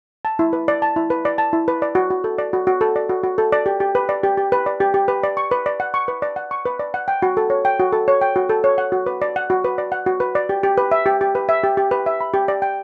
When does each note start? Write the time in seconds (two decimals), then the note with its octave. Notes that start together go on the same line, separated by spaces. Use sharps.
0.25 A5
0.39 E4
0.53 B4
0.68 D5
0.82 A5
0.96 E4
1.10 B4
1.25 D5
1.38 A5
1.53 E4
1.68 B4
1.82 D5
1.95 F#4
2.11 F#4
2.24 A4
2.38 D5
2.53 F#4
2.67 F#4
2.81 A4
2.96 D5
3.09 F#4
3.24 F#4
3.38 A4
3.52 D5
3.66 G4
3.80 G4
3.95 B4
4.09 D5
4.23 G4
4.38 G4
4.52 B4
4.66 D5
4.80 G4
4.94 G4
5.08 B4
5.23 D5
5.37 C#6
5.51 B4
5.66 D5
5.80 F#5
5.94 C#6
6.08 B4
6.22 D5
6.36 F#5
6.51 C#6
6.65 B4
6.79 D5
6.94 F#5
7.08 G5
7.22 F#4
7.37 A4
7.50 C#5
7.65 G5
7.80 F#4
7.93 A4
8.08 C#5
8.21 G5
8.36 F#4
8.49 A4
8.64 C#5
8.78 F#5
8.92 F#4
9.06 B4
9.22 D5
9.36 F#5
9.50 F#4
9.64 B4
9.78 D5
9.92 F#5
10.06 F#4
10.20 B4
10.35 D5
10.49 G4
10.63 G4
10.78 B4
10.92 E5
11.06 G4
11.21 G4
11.35 B4
11.49 E5
11.64 G4
11.77 G4
11.91 B4
12.06 E5
12.21 B5
12.34 G4
12.48 D5
12.62 G5